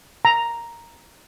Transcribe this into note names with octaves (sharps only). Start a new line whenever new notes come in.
A#5